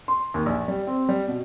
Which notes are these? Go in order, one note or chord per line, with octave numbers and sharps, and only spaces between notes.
C6
D#2
A#1
G3
C4
G3
B2